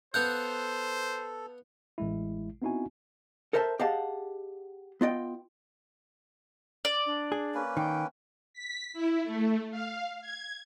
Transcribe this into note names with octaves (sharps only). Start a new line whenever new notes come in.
B3 A4 C5 F5 F#5 F#6 G6
A1 G#3 E4
B3 C4 D#4 E4 F#4 G#5
A4 A#4 C5 E5 A5
G4 G#4 D#5 F5 F#5 A5
B3 F4 D#5 G5
D5
D4
G#4
A#3 C#4 B4
D#3 G5
B6
E4
A3
F5
G#6